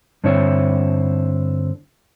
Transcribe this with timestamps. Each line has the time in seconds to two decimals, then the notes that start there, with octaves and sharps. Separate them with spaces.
0.24 G2 D3 C4 E4 C#5